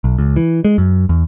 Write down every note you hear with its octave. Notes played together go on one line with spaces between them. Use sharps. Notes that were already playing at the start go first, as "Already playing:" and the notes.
B1
C#2
E3
G#3
F#2
E2